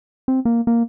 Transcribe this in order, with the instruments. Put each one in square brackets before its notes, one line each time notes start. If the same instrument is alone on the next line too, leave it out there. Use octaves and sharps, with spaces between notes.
[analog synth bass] C4
A#3
A#3